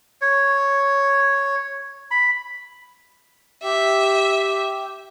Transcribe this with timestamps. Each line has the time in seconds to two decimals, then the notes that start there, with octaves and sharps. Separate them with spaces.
0.22 C#5
2.11 B5
3.64 G4 E5